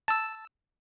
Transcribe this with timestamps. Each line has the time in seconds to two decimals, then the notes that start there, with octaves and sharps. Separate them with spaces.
0.08 A5 E6